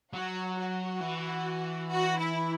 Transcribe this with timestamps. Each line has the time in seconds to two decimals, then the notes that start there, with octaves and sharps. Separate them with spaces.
0.13 F#3 F#4
0.57 F#4
1.01 E3
1.89 F#4
2.18 E4